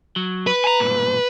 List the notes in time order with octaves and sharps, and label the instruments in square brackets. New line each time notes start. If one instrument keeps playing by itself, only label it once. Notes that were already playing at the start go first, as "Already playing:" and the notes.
[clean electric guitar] F#3
[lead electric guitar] B4
[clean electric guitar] G#5 A#5
B1 G2 A#2